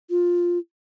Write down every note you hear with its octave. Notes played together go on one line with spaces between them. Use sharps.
F4